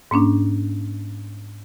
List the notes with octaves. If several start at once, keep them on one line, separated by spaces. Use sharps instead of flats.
G#2 A#3 C#4 D4